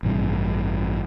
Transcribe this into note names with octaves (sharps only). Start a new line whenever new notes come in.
A1 G2 C3